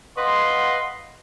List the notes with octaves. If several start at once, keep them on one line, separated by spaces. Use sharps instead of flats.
B4 D#5 F5 F#5 C6